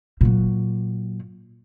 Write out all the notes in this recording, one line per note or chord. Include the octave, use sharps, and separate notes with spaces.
A#2 F#3